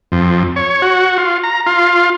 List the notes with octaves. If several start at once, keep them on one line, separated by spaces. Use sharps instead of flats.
F2
C#5
F#4
F4
A#5
F4